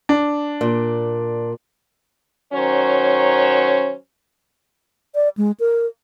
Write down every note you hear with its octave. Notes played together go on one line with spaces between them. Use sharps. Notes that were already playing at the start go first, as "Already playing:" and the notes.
D4
A#2
D#3 F#3 C#4 C5 C#5
D5
G#3
A#4